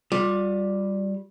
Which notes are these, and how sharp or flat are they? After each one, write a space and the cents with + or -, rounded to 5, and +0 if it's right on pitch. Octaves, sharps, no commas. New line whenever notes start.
G3 +0 F4 +35